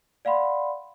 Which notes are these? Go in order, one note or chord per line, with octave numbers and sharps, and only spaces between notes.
D5 F5 F#5 B5 C6